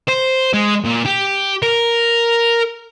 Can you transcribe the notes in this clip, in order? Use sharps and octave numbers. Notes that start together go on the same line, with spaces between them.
C5
G#3
A#2
G4
A#4